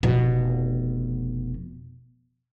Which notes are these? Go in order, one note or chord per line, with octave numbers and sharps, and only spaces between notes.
F1 B2